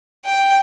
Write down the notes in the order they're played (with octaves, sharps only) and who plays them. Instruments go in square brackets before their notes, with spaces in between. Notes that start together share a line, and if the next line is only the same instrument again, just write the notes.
[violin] G5